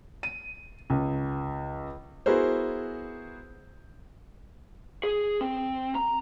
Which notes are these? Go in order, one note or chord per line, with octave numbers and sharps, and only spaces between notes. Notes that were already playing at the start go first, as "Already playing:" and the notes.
D#7
C#2
B3 E4 F#4 G#4 A#4 C5
G#4
C4
A#5